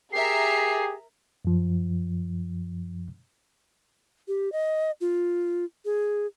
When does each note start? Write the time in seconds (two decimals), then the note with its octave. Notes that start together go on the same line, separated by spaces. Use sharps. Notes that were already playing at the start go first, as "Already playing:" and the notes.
0.13 G4 G#4 A#4 E5 A#5 C7
1.45 F#2 F3
4.28 G4
4.52 D#5
5.01 F4
5.85 G#4